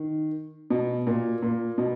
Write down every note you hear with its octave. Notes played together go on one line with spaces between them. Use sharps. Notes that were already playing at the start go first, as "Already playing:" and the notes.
Already playing: D#3
B2
A#2
A#2
B2